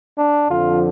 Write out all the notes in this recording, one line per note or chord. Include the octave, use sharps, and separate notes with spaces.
D4
F2 D3 F3 F4